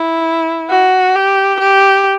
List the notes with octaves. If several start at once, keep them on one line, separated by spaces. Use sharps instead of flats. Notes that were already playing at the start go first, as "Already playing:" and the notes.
Already playing: E4
F#4
G4
G4